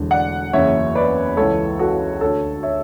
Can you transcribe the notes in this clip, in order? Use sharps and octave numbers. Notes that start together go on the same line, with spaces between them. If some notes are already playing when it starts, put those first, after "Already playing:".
Already playing: E1 E2 D3
D5 F#5
F#1 E2 C#3 C#5 E5
B4 D5
C#2 C#3 E3 A4 C#5
F#4 A4
D2 D3 A4 C#5
C#5 E5